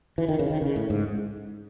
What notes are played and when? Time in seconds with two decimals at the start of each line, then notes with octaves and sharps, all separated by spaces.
0.18 E3
0.29 D#3
0.39 C#3
0.50 D#3
0.62 C#3
0.76 A2
0.90 G#2